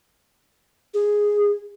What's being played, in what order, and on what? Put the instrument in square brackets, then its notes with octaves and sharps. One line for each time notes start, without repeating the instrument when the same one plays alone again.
[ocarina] G#4